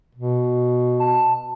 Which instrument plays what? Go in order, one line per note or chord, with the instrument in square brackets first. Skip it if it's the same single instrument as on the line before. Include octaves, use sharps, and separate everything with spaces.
[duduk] B2
[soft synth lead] A5